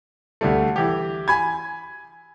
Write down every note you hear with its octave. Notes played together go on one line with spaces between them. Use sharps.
D2 G3 A3
E3 G4
G#5 B5 G#6